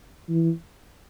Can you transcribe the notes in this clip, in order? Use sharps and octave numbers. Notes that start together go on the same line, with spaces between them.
E3